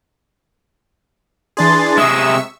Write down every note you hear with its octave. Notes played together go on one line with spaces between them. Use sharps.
E3 D4 G#4 C6 A6
C3 G#3 E5 C#6 D#6 E6 E7